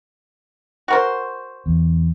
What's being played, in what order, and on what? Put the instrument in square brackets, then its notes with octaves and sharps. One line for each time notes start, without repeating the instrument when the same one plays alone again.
[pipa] F#4 A#4 C5
[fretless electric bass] E2